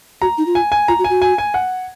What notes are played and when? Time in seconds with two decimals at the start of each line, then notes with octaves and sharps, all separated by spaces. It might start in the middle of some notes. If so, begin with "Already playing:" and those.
0.21 F#4 A#5
0.38 D#4
0.46 F4
0.55 G#5
0.72 G#5
0.88 F4 A#5
0.99 F#4
1.04 G#5
1.10 F#4
1.22 G#5
1.38 G#5
1.54 F#5